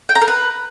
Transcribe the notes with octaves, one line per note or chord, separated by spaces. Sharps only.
G5
A#5
A#4
B4